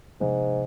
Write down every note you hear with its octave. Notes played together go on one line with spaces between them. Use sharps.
G#2 C3 F3 B3